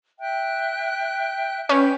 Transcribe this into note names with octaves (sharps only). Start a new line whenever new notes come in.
E5 G5 F#6
C#4 B4 G5 G6